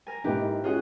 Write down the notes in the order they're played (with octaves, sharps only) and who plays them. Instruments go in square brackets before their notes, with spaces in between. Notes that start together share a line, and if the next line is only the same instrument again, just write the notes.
[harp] A#4 G#5
[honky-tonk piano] G#2 A#3 D#4 [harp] E3 G4
[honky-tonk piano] C#4 F#4 [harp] F4 G#4 F#5